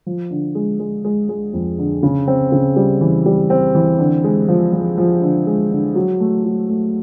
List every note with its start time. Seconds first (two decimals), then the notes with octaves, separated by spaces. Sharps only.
0.06 F3
0.31 D3
0.55 G#3
0.79 G#3
1.05 G#3
1.29 G#3
1.53 F2
1.78 D3
2.03 C#3
2.27 C4
2.52 C#3
2.76 G3
3.01 E3
3.26 G3
3.50 C4
3.75 E3
3.99 D3
4.24 G#3
4.48 F3
4.73 F3
4.98 F3
5.22 D3
5.47 G#3
5.71 D3
5.95 F#3
6.20 A3
6.45 F#3
6.69 A3